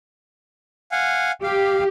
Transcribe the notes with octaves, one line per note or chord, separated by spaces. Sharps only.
F5 F#5 G#5
G4 F5